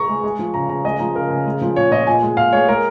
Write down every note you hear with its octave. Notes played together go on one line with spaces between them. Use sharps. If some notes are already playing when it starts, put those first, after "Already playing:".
Already playing: A#5 C#6
G#3
G#3
F3
C#3 A#5
C#3 A#5
G#3 D#5
F3 A#5
C#3 A#4
C#3
G#3
F3
A#2 C#5
A#2 D#5
A#2 G#5
G#3
A#2 F5
G#3 C#5
G#3 A#4